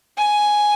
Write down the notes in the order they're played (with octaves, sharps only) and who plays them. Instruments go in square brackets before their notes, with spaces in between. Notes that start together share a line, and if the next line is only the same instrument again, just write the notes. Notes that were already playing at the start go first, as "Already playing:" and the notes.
[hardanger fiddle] G#5